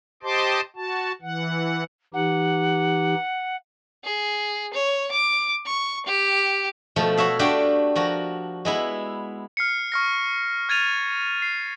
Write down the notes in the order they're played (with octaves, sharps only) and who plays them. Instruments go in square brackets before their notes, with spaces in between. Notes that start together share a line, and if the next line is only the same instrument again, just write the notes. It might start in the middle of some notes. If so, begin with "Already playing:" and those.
[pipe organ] G4 C5 D#5 A5 C6 D6
F#4 A5
E3 F#5
[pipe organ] E3 D#4 G4 [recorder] F#5
[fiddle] G#4
C#5
D6
C#6
G4
[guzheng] B2 F3 A3
F#4 C#5 E5 F5
A3 D4 F#4 G4 F5 G5
F3 F#4 A#4
G#3 B3 E4
[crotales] F6 C7 C#7
C#6 F6 A#6
F6 G#6 A6 D#7 F7
C7